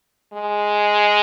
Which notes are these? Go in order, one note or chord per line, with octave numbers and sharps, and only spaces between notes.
G#3